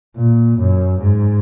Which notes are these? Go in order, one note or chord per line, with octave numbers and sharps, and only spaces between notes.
A#2
F#2
G#2